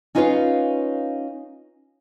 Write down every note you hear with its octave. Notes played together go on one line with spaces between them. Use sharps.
C#4 D#4 F4 B4 C#5 F5